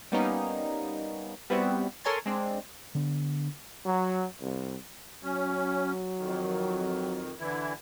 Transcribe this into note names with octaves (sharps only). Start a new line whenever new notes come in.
G3 A#3 B3 C#4 D#4
G3 B3 C4 E4 F#4
A4 A#4 C#5 G#5 C6 A6
G#3 C4 D4
D3 B3 D4
F#3
C2
F#3 C#4
F2 D#3
D3 E3 E4